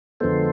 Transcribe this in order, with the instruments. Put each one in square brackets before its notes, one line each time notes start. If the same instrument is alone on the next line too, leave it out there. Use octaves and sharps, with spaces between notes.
[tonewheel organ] F2 D3 F3 G#3 B3 A4 C5